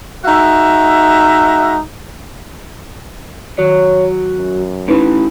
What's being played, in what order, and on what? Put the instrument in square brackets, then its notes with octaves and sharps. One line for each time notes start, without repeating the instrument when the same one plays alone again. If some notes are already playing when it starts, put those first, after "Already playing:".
[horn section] G#3 D#4 F#4 E5
[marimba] D#3 [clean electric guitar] F#3 [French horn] C#5
[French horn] F#2
[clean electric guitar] A2 E3 [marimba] C#4 D#4 B4